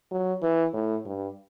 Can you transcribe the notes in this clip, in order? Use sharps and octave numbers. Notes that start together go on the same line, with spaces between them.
F#3
E3
A2
G2